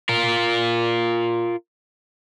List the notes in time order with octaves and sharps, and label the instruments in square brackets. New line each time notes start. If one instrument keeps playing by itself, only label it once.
[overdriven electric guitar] F4 A#4